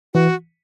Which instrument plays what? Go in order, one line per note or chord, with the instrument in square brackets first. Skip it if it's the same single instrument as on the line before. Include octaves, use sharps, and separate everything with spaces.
[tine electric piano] E3 [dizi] F#4